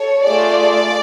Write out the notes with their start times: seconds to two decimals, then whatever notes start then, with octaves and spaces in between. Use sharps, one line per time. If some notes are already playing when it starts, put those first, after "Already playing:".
Already playing: A4 C#5
0.26 A3 F4 G#4 D5